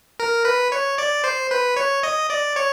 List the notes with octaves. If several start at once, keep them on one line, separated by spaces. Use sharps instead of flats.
A#4
B4
C#5
D5
C5
B4
C#5
D#5
D5
C#5